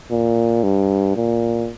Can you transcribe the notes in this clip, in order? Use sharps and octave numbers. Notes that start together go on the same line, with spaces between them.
A#2
G2
A#2